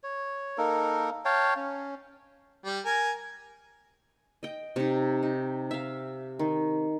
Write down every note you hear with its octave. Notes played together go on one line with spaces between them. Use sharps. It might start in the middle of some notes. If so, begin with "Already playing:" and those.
C#5
A#3 D#4 A4 A#4
C#5 F5 G5 A5
C#4
G3
A#4 G#5
D#5 G5
C3 D#4
D#4
E5 F5
D#3